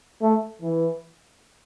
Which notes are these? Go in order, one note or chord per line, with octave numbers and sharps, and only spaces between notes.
A3
E3